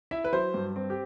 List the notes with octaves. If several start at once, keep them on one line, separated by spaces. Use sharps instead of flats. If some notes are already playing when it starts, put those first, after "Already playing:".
E4 E5
B4
F#3 C5
G2
C4
G4